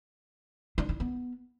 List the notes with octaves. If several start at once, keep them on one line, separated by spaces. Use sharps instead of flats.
D4
E4
B3